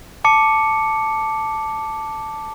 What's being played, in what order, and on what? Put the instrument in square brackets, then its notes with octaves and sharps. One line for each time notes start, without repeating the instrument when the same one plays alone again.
[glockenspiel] A5 D6 C#7